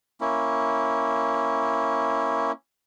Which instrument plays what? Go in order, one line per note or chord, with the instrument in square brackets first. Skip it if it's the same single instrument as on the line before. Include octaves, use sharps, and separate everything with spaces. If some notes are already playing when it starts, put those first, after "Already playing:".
[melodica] A#3 C#4 E4